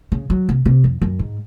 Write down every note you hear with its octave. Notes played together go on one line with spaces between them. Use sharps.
C#3
F#3
C3
C3
F2
F#2
G#2